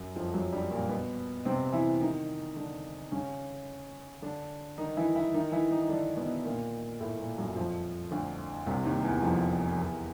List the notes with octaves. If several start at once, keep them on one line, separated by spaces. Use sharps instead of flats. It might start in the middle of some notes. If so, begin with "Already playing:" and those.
Already playing: F#2 F#3
F2 F3
F#2 F#3
G2 G3
A#2 A#3
B2 B3
C3 C4
E3 E4
D#3 D#4
D3 D4
C#3 C#4
D3 D4
D#3 D#4
E3 E4
E3 E4
D#3 D#4
E3 E4
D#3 D#4
D#4
D3 D4
B2 B3
A#2 A#3
A2 A3
A#2 A#3
F#2 F#3
F2 F3
D2 D3
C2 C3
D#2 D#3
E2 E3
F2 F3
E2 E3